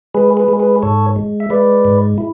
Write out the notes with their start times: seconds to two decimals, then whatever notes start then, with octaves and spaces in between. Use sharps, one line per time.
0.14 G#3 G#4 B4
0.37 G#4 B4
0.48 G#3
0.60 G#4 B4
0.82 G#2 A4 C#5
1.16 G#3
1.40 E5
1.50 G#3 B4 D5
1.85 G#2
2.18 E4